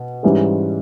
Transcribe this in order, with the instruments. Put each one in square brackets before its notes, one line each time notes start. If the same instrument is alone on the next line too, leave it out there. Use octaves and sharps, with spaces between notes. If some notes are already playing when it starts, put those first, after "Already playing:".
Already playing: [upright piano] B2
G#2 E3 G3 C#4 G#4